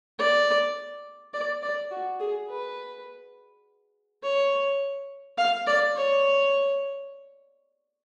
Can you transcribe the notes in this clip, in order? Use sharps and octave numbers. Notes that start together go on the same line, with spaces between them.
D5
D5
D5
F#4
G#4
B4
C#5
F5
D5
C#5